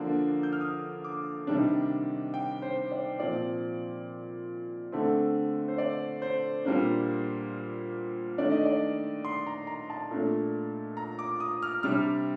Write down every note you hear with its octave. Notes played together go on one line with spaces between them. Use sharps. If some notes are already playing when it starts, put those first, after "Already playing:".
Already playing: D3 F3 A#3 D4
G6
F6
D#6
D6
C3 D#3 G3 D4
G5
C5
D5
A#2 F3 C4 D5
D3 A3 C4
C5
D5
C5
A#2 G3 A#3 D4
D#3 A3 D4 D5
D#5
D5
C6
A#5
A#5
A5
A#2 A3 D4
A#5
D6
D#6
F6
C3 G3 D4 F6